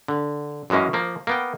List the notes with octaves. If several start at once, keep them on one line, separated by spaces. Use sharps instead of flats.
D3
F#2 E3 G#3 A#3 C#4
F3 A#3
A#3 B3 G5